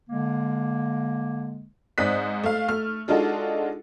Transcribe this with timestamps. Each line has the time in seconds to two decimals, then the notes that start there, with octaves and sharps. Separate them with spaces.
0.09 D3 G#3 A#3
1.98 G#2 C4 D5 D#6 F#6 B6
2.44 A3 F5
2.68 A3 F6
3.08 G#3 D4 D#4 F4 F#4 A4